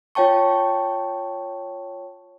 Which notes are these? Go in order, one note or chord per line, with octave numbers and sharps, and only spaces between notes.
F4 C#5 G5 A5 C#6